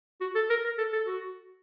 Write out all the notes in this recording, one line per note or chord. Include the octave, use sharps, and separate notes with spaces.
F#4
A4
A#4
A#4
A4
A4
F#4